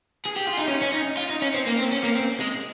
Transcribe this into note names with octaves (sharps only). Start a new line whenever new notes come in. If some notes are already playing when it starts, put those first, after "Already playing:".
G#4
G4
F4
D#4
C#4
C#4
D#4
F4
D#4
C#4
C4
A#3
C4
C#4
A#3
C4
G#3